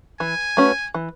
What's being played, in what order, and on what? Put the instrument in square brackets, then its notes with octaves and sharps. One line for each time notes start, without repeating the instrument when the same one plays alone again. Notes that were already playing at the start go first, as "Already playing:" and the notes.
[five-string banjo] E3 [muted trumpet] G#5
[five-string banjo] A3 C#4 F#4 B4
E3